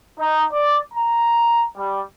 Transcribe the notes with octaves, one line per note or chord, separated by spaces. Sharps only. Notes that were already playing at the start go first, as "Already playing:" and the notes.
D#4
D5
A#5
G3